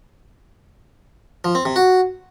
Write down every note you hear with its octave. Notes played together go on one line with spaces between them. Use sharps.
F3
C4
C3
F#4